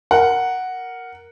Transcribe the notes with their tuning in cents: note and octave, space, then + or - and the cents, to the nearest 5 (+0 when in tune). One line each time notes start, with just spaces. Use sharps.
A#4 +0 F#5 +0